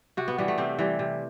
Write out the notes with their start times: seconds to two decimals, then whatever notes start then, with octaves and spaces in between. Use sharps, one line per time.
0.17 C3 F#4
0.28 B3
0.38 E3 G3 B3
0.48 A3
0.58 C3 C4
0.79 E3 G3
0.99 C3